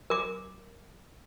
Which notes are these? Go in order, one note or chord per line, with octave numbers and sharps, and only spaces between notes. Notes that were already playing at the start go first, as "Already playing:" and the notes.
A#4 D6